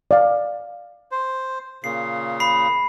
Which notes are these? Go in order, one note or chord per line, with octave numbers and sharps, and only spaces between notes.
D5 F5
C5
A#2 C#3 C7
B5 C7